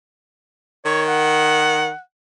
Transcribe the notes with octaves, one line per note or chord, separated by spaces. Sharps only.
D#3 C#5
F#5